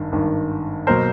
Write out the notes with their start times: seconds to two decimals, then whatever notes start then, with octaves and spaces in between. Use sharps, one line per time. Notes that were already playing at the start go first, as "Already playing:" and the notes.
Already playing: G#1 G2 D#3
0.12 G#1 G2 D#3
0.87 B2 F#3 A#3 A#4 C5